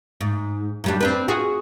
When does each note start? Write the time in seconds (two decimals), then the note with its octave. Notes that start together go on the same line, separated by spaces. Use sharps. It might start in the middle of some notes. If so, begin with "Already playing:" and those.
0.21 G#2
0.84 F#2 G3 D4
1.01 C4 D4 B4
1.28 F4 F#4 G#4